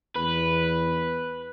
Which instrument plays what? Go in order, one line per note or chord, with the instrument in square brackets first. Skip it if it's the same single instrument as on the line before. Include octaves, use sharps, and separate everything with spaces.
[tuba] E2 [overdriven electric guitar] B4